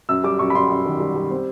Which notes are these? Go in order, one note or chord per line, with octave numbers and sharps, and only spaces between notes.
F#2 E6
G3 D6
F#2 C#6
B5
F#2 C6
F#2
D#3
G3
G3
C4